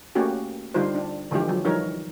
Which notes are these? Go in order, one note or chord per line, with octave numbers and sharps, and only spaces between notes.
A3 A#3 C#4 F#4 G4
D3 G3 D#4 F4 C5
D4
D3 E3 F3 G#3 G4
F3 F#3
E3 F3 G3 D#4 A#4 C#5